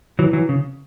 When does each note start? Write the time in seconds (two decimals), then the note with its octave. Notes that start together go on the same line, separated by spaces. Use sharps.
0.19 E3 F#3
0.33 E3 F#3
0.49 C#3